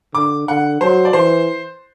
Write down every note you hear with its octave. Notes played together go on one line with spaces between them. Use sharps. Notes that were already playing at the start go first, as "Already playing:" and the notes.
D3 D6
D3 F#5
F#3 C5
D5
E3 C5